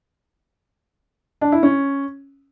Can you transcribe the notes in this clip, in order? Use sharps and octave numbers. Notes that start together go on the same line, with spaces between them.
D4
E4
C#4